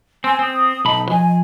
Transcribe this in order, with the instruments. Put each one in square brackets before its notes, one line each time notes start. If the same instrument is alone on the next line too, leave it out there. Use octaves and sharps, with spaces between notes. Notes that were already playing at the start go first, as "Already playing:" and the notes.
[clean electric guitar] C4 [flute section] G#5 C6 E6
[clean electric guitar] C4 [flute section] D#6
[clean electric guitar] B1 B5 [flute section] D#4 A5
[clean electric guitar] F3 [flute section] D#5 G#5